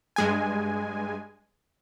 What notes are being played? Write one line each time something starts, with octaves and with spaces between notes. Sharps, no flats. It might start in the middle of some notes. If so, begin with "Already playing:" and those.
G2 G#3 G#5